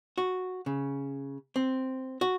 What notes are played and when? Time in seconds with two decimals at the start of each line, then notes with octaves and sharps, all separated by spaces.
0.18 F#4
0.66 C#3
1.56 C4
2.21 F#4